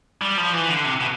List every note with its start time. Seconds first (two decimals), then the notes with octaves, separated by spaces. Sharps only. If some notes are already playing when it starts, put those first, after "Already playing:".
0.22 G3
0.38 F3
0.53 E3
0.69 D3
0.85 C3
1.01 B2